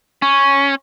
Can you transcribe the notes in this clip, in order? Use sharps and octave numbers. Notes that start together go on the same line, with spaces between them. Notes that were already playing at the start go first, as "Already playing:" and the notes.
C#4